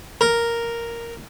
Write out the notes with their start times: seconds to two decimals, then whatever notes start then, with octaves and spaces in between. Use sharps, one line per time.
0.21 A#4